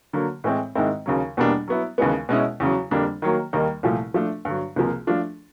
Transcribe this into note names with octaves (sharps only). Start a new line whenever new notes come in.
D3 F#3 A#3
A2 E3 G#3 C4
G#2 D#3 G#3 C4 E4
D#2 C#3 F#3
E2 B2 G3 A#3 D4
F#3 B3 E4
D#2 C#3 E3 G#3 B3
B2 G#3 C#4 E4
E2 C#3 F#3
F2 D3 G3 A#3 D4
D#3 F#3 A#3
D#2 D#3 G3 A#3 D#4
C2 A#2 F3 A3
F3 A3 D4
G2 D3 F#3
C#2 C3 F3 A#3
F3 A3 D4 F4